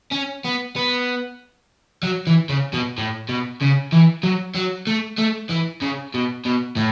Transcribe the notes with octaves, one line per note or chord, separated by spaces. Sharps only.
C#4
B3
B3
F#3
E3
C#3
B2
A2
B2
C#3
E3
F#3
F#3
A3
A3
E3
C#3
B2
B2
A2